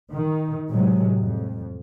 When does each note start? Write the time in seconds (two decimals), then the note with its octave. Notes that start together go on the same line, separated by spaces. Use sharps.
0.12 D#3
0.70 A2 C3 F#3 G#3
1.20 F2